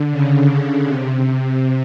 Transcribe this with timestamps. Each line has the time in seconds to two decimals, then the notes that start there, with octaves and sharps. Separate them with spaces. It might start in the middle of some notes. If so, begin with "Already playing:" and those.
Already playing: D3
0.12 C#3
0.87 C3